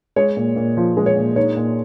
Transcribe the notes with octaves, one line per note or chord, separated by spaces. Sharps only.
G#3 C#5
A#2
A#2
F3
G#3
C#5
A#2
D#4 C#5
A#2